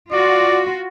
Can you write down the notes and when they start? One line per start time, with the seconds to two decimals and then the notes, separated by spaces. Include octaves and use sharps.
0.12 F4 F#4 D5